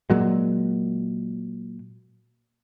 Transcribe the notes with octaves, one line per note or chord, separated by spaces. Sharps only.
A#2 F#3 G#3